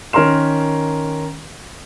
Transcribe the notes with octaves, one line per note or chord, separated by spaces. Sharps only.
D#3 C#4 A#4 A#5 C6 E7